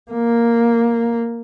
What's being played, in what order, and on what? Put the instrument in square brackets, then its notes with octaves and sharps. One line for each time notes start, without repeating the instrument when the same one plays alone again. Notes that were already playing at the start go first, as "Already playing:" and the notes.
[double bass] A#3